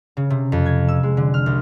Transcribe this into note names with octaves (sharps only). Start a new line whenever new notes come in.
C#3
C3
F2
G#6
E6
G#3
D3
F6
C2